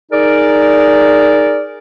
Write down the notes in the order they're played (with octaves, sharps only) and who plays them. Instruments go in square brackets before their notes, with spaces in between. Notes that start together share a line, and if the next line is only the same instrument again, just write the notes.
[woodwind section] D#4 G#4 A#4 D5